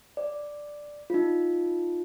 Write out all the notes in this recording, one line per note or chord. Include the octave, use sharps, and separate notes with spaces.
D5
D#4 F4